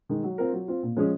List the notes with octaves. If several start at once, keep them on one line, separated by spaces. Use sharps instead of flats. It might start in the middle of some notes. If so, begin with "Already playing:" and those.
D#3 G#3
F#3
C4 F4 A#4
F#3
C4 F4
A#2
F3 G#3 C#4 G#4